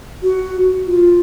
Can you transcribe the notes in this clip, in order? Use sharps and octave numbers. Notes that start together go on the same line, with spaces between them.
F#4
F4